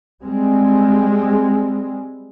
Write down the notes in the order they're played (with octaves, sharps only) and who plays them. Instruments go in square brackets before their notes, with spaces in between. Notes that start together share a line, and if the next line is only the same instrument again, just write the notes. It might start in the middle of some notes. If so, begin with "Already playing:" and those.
[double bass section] G3 G#3 C4